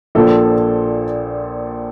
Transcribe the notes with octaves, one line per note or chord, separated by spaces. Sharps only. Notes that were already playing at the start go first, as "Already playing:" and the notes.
A#1 A#2 F3 A4